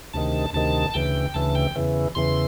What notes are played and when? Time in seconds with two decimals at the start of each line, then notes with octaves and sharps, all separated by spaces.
0.14 D2 C3 D#3 A5
0.53 D2 C3 D#3 A5
0.94 D2 C#3 E3 G5
1.34 D2 C#3 E3 A5
1.55 G5
1.76 E2 C#3 E3
2.15 E2 C#3 E3 C6